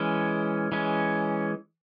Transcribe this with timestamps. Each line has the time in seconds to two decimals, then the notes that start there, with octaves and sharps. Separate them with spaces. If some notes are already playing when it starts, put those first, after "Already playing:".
Already playing: E3 G#3 C#4
0.72 E3 G#3 C#4